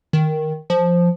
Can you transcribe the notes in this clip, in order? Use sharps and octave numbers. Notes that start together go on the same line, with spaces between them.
D#3
F3